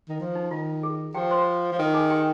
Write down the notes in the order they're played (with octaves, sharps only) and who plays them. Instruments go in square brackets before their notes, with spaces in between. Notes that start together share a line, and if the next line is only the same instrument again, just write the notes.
[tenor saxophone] D#3
F3
[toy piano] D#4
[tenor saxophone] D#3 [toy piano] F4
[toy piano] G#4
[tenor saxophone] F3 [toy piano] G4 G5
[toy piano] C5 C6
[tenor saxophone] F3
D#3
[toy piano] G#4 G#5
G4 G5